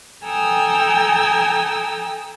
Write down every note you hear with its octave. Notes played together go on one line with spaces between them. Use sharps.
A4 G5 G#5 A#5 D#6 E6